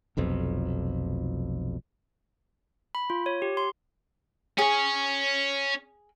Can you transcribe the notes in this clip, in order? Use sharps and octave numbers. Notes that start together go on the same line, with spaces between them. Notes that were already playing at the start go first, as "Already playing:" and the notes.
F1 B1 F2
B5
F4
C#5
G4
C6
C#4 G#4 C#5